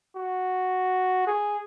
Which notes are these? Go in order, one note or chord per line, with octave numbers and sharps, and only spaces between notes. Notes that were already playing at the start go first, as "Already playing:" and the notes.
F#4
G#4